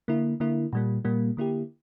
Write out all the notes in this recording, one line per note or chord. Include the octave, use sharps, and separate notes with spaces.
D3 A#3 E4
D3 A#3 E4
A#2 G3 A#3
A#2 G3 A#3
D3 A#3 E4 G4